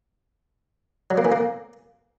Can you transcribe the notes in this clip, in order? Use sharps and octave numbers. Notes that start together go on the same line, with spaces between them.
F#3
A#3
E3
A#3